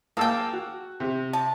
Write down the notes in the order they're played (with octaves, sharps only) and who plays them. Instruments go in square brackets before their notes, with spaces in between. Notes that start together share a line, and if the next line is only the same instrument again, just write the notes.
[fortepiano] A#3 A5 E6 [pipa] G#4 G5
[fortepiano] F#4
C3
[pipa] A5